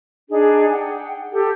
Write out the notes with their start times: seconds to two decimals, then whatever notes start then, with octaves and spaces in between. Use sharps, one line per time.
0.29 D4 D#4 G#4
0.71 F#5 G5
1.32 G4 A4 G5